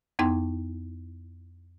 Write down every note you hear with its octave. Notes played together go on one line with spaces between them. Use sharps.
F2 B3 D#4 E4 G5 C6